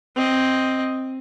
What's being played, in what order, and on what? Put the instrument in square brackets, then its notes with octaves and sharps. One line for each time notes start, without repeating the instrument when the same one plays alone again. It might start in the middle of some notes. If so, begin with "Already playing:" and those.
[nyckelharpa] C4 D#5